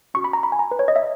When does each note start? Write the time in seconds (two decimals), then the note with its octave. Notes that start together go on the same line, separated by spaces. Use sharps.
0.14 C#4 F#4 C#6
0.24 B5
0.33 A#5
0.43 B5
0.52 G#5
0.59 A#5
0.71 B4
0.79 C#5
0.88 D#5
0.96 E5